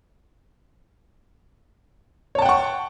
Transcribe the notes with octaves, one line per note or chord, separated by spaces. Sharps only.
C#5 F#5 G5 A5 C#6